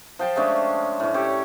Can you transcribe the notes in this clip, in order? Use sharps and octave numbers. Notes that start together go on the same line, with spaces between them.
F3 G5 A5
G#3 A3 C#4 D4
A2 C#4
C#4 G4 A4 C#5